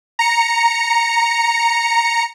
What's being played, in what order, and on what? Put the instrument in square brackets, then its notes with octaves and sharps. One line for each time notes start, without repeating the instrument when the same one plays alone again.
[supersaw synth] A#5 C#7